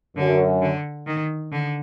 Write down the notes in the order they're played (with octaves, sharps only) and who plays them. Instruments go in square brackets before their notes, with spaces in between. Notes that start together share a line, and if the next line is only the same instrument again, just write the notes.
[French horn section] F#2 [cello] D3
[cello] D3
D#3
D3